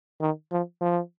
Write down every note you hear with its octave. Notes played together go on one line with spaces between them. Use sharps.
D#3
F3
F3